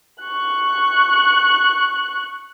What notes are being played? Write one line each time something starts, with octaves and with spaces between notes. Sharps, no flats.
C#6 F#6